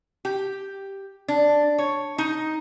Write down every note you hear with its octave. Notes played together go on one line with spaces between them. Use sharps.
G4
D4
C#5
D#4